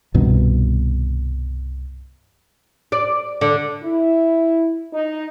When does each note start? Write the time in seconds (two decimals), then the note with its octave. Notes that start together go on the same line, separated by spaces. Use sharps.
0.14 C2 G2 B2 D#3
2.92 D5
3.41 D3
3.83 E4
4.93 D#4